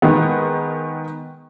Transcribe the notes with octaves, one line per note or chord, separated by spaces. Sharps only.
D#3 G#3 B3